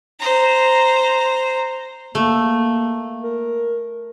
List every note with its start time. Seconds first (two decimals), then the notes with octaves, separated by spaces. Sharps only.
0.20 C5 A#5
2.15 A3 A#3
3.23 A#4